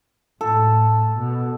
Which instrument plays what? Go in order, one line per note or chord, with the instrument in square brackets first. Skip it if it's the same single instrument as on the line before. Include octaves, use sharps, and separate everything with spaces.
[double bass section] A2 [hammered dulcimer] A4
[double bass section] B2